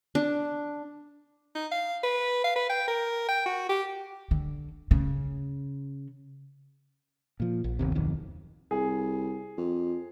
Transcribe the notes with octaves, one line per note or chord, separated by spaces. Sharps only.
D4
D#4
F5
B4
F5
B4
G5
A#4
G5
F#4
G4
D3
C#3
A#2 F3
A#1
G1 D#2 C3
D1 B1 F2 D#3
C2 G#4
F2